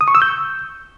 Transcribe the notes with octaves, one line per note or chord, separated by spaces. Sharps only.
D#6
C#6
E6
G6